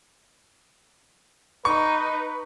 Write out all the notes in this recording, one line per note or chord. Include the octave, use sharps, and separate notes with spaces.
D#4 B4 C#6